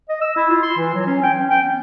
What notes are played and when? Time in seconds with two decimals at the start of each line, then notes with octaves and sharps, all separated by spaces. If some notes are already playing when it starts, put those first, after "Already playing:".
0.09 D#5
0.21 E6
0.37 E4
0.50 F4
0.63 C6
0.76 E3
0.94 F#3
1.06 C#4
1.23 G5
1.38 C#4
1.50 G5
1.64 B3